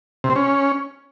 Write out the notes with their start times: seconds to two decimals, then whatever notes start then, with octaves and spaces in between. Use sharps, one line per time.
0.24 C3
0.30 C4
0.36 C#4